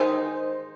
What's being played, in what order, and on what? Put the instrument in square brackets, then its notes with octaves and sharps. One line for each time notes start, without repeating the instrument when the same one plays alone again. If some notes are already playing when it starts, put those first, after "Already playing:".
Already playing: [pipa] D#3 G#3 D#4 [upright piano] C5